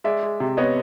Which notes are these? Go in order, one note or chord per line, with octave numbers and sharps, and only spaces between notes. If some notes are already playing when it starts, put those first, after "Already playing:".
G#3 D5 E5
G#3
C3
B3 C#5 D#5